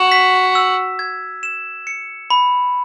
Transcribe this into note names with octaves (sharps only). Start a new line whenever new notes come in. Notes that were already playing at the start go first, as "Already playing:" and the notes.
Already playing: F#4 E7
B6
E6
G#6
E7
C#7
B5